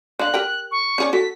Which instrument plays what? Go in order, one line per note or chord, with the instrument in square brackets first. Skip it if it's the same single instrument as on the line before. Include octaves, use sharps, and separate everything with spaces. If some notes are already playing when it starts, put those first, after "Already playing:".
[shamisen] D3 F5 [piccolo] F#6
[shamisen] G4 A#4 G5
[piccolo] C#6
[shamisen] C#4 G#4 D5
[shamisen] F#4 A4 [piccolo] B6